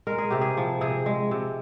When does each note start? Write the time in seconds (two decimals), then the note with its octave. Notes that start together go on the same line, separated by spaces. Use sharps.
0.07 G#3 A#4
0.18 G#4
0.30 C3 G4
0.41 G#4
0.57 F3
0.81 C3 G#4
1.06 G#3
1.31 C3